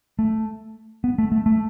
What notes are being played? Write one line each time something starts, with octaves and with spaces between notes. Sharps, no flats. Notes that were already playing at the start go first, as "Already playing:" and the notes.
A3
B3
A3
A3
A3